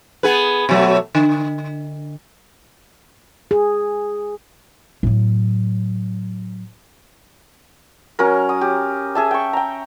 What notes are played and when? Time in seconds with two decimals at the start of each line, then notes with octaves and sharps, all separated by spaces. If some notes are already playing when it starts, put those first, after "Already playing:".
0.23 B3 G#4 B4
0.69 B2 F#3 A3
1.15 D3
3.51 G#4
5.03 A2 F#3
8.19 F#3 C#4 A#4
8.49 D#6
8.61 G4
9.15 G#4 E5 A5
9.31 G5 C#6
9.53 G5 A#5